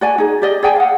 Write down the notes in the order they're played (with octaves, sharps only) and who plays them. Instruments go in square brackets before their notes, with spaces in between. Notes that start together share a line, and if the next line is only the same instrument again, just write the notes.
[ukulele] F#4 D5 G#5
D#4 G#4
G4 D5 D#5
G#4 D5 G5 G#5
F5 F#5